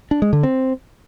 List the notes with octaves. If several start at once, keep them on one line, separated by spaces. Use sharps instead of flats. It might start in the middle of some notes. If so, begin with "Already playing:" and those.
D4
G#3
D3
C4